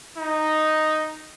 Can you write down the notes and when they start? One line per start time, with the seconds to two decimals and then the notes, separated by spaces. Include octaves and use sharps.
0.18 D#4